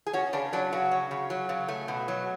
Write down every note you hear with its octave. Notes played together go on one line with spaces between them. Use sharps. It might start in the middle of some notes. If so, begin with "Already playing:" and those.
G#4
C#4 F#4
C#3 D4
F#3 D4
C#3 F#4
C#4
C#3
F#3
C#3
A3
B2
F#3